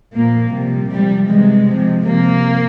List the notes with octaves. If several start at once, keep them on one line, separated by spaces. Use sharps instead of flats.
A#2 F3 A#3
C3 F3 G3
C3 F3 G3
C3 E3 G#3
C3 F3
C3 F3 A#3